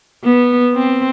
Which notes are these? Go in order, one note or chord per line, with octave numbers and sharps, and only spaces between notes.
B3
C4